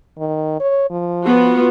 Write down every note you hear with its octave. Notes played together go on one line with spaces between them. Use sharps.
D#3
C#5
F3
B3 F4 F#4